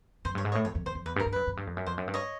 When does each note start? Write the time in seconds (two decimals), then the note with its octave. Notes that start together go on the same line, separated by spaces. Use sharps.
0.25 F#2 C5
0.35 G2 C#5
0.45 G#2
0.52 C#5 D#5
0.55 A2
0.65 F2 C#5
0.75 F2
0.86 E2 C5
0.95 F2
1.06 E2 B4
1.16 G2
1.20 A#4
1.26 G2
1.33 F#2 B4
1.47 F#2
1.57 G2
1.67 F2
1.77 F#2
1.86 F2 C5
1.98 F#2
2.08 G2
2.14 C#5 D#5